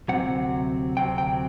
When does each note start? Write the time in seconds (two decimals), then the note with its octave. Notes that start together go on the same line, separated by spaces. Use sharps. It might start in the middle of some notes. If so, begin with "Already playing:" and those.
0.08 D2 C3 F#3 C4 F#5
0.96 D2 C3 F#3 C4 G5
1.18 G5